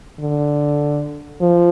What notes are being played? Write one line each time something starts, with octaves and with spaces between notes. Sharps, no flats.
D3
F3